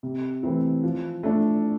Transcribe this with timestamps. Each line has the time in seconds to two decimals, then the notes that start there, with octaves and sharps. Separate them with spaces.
0.03 C3
0.43 E3 A3 C4 E4
0.83 F3
1.23 A3 D4